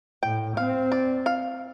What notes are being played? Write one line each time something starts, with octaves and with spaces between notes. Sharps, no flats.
A2 G5
C4 F5
D5
F5